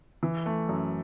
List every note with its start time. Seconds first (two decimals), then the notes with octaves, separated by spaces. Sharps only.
0.23 E3
0.46 A3
0.69 F#2